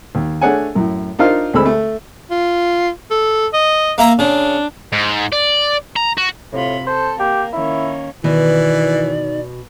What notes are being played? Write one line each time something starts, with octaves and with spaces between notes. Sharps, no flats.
D#2
A3 D4 G#4 C#5 F#5 G#5
F#2 A2
D4 D#4 F4 A#4 C5 F5
D2 G#3 C4 A4 B5 E6
A3
F4
A4
D#5
A#3 E5 A#5
C#3 D4
G#2
D5
A#5
F#4
A2 C3 F4 B5
A4 C5
A#3 G4
D#3 A#3 C#4 E4
B2 D#3 E3 D5